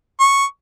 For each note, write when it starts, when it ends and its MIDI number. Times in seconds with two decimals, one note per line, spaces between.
0.20 0.45 85